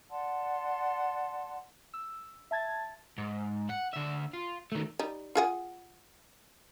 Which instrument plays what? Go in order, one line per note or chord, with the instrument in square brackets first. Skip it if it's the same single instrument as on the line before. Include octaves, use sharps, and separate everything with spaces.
[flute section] D5 F#5 A5 C6
[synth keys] E6
E5 A5 G#6 A6
[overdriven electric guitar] G#2
F#5
D2 E5
F4
D#3 A3
[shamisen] G3 D#4
F4 G#4 F#5